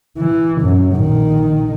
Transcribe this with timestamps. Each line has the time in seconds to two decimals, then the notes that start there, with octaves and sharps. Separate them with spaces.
0.17 E3
0.61 F#2
0.95 A#1 D#3